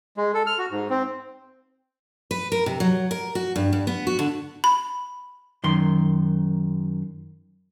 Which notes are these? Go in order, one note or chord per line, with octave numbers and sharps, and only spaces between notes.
G#3
A4
F6
F#4
G#2
C4
B4
A#4
C3
F#3
A#4
F#4
G2
G2
B3
F#4
D3
B5
F#2 D#3 C6